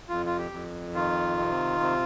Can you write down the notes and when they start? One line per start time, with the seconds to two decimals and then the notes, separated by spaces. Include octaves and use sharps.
0.09 F2 F4
0.26 F4
0.38 G4
0.52 F2
0.95 D#3 F4
1.38 C3
1.80 C3